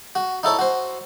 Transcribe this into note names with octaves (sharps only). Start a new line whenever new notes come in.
F#4
D#4 E4 A4 C#5
F#4 C5